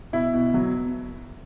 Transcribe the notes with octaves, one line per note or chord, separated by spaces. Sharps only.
B2 E4
B2
F#3